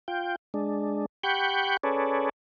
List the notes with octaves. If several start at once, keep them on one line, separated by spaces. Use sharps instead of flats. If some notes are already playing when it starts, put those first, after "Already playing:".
F4 G5
G#3 D4
G4 F#5 G5 B5 C#6 G6
C#4 G#4 A4 B4 C#5 D5